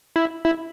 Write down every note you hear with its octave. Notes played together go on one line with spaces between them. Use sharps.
E4
E4